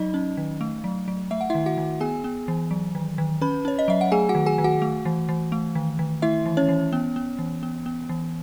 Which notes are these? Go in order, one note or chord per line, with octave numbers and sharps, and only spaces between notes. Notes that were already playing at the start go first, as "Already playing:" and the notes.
Already playing: F#3 D#4 D#5
C#4
D#3
A3
F#3
F#3
A3 E5
F#5
D#3 E4 E5
F#4 F#5
D#3
B3 G#4 G#5
B3
E3
F#3
D#3
D#3
C#4 B4 B5
C#4 C#5
D#5
F#3 E5
F#5
A3 G#4 G#5
F#4 F#5
D#3
G#4 G#5
D#3
F#4 F#5
A3
E3
E3
A3
D#3
D#3
A3 E4 E5
E3
C#4 C#5
E3
B3
B3
E3
B3
B3
E3